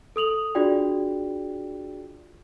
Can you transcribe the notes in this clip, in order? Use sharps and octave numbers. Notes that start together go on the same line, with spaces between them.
A4 D#6 F7 F#7
D4 F4 F#4 G#4 D5 G5